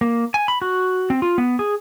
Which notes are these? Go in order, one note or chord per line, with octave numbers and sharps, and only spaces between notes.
A#3
G#5
B5
F#4
C4
F4
B3
G#4